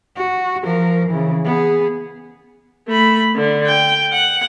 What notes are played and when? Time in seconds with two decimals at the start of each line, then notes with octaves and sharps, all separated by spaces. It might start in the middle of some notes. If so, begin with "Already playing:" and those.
0.16 F#4
0.64 F3 A#4
1.09 C#3 E3
1.45 B3 G#4
2.88 A3 B5
3.36 D3
3.66 G5
4.12 F#5